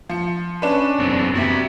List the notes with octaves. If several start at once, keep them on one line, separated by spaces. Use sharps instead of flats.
F3 C#7
C#4 D4 B4
F#2 B3 C4
C3 B3 F#4 E5